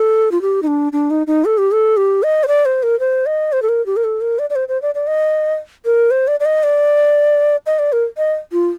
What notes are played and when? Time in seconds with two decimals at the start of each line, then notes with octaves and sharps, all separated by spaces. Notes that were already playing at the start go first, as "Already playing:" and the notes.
Already playing: A4
0.32 F4
0.42 G4
0.63 D#4
0.67 D4
0.93 D4
1.11 D#4
1.27 D#4
1.45 A4
1.58 G4
1.72 A4
1.97 G4
2.23 D#5
2.43 C5
2.48 D5
2.65 C5
2.83 A#4
3.00 C5
3.26 D#5
3.53 C5
3.62 A4
3.69 A#4
3.86 G4
3.96 A#4
4.04 A4
4.21 A#4
4.39 D5
4.50 D5
4.55 C5
4.68 C5
4.82 D5
4.95 D5
5.07 D#5
5.85 A#4
6.11 C5
6.28 D5
6.40 D5
6.45 D#5
6.63 D5
7.66 D#5
7.79 D5
7.93 A#4
8.17 D#5
8.52 F4